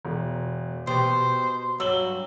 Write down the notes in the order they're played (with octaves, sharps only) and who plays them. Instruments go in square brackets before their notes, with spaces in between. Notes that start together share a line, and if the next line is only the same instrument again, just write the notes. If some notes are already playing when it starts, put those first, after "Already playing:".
[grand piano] E1
[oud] B2 [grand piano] G4 [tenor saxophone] C5
[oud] G2 [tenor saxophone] F#3 [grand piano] E6 F#7 G7